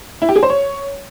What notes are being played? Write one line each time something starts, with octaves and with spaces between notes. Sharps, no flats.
E4
G4
G#4
C5
C#5